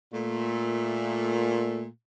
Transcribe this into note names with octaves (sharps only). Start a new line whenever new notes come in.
A#2 A3